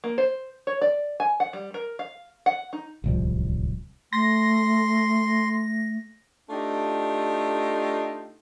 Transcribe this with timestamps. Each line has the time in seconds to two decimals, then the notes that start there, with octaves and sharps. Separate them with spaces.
0.04 A#3
0.18 C5
0.67 C#5
0.81 D5
1.20 G#5
1.40 F#5
1.53 G3
1.74 A#4
1.99 F5
2.46 F#5
2.73 D#4
3.04 D1 C2 F3
4.13 A3 C6 A#6
6.50 A3 D4 D#4 F4 G4